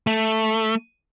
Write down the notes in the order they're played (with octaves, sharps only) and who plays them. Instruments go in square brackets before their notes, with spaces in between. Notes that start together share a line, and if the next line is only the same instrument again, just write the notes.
[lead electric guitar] A3